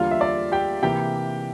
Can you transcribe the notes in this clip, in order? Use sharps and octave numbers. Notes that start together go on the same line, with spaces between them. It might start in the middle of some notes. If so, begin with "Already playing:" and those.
Already playing: E2 D3 G3 A#3 F4 F5
E5
D5
G4 G5
C3 E3 A#3 G4 G5